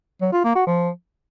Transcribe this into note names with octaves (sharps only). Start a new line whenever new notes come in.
F#3
F4
A#3
F#4
F3